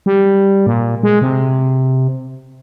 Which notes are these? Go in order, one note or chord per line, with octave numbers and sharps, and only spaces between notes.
G3
A#2
G#3
C3